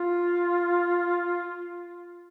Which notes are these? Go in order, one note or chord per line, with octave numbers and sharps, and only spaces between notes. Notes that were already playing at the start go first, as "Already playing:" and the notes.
Already playing: F4